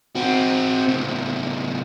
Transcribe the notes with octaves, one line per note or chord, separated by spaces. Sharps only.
C4 F#4
C#2 A2